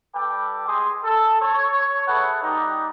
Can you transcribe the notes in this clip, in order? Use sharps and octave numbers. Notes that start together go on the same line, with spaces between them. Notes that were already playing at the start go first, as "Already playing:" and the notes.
G3 A4 B4 G5 D6
G#3 G4 G#4 D#5 C6 D#6
A4
C#5
E4 G#4 A4 B4 F#5
G3 D#4 G4